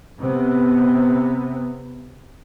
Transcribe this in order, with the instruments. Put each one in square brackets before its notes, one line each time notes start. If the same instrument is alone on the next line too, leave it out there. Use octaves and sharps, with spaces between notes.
[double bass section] C3 B3